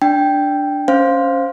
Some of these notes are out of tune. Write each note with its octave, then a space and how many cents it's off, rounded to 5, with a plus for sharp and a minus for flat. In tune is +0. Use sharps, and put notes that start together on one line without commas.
D4 +0 G5 +0
C#4 +0 C5 +0 F5 +0